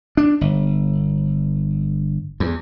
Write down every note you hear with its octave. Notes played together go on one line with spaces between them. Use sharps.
D4
G1
E2